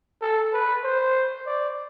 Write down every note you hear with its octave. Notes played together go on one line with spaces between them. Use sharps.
A4
B4
C5
D5